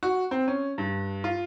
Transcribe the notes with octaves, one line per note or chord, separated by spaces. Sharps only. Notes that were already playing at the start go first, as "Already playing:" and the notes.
F#4
C4
C#4
G2
F4